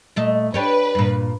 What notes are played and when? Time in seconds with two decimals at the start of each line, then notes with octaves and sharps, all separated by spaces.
0.16 A#2 A3 D#5
0.54 D4 G4 B4 C#5
0.95 G2 A#2